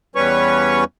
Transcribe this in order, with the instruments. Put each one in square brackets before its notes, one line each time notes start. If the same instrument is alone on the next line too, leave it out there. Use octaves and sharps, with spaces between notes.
[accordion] E2 G3 C#4 B4 C#5 C#6